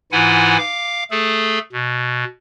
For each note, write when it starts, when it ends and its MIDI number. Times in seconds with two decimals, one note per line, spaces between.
0.12 0.57 44
0.12 0.57 52
0.12 0.57 64
0.12 0.57 65
0.12 0.57 78
0.12 0.57 80
0.58 1.04 77
0.58 1.04 86
1.11 1.59 57
1.11 1.59 68
1.11 1.59 69
1.72 2.24 47